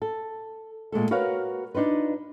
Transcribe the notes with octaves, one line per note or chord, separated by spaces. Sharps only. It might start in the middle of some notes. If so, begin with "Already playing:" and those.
A4
A#2 G#3 A3 A4
F#4 A#4 B4 C#5 F5
D4 D#4 F4 B4